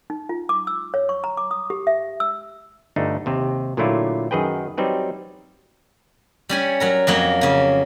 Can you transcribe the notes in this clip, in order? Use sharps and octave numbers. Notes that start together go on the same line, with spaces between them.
D#4
F4
D6
E6
C#5
C#6
A#5
D6
D#6
G4
E5
E6
G1 A3 D4 D#4
D#2 C3 C4
A#2 D3 F#3 A3 E4 F4
F#2 D#3 G#4 B4 G5
F#3 G3 C4 D#4 B4
G3 C#4 G#5
F#3 A#4 A#5
F2 F#3 A#3
C#3 A#3